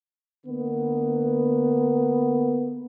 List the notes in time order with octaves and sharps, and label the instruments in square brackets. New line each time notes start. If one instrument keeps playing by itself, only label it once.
[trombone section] D3 A#3 B3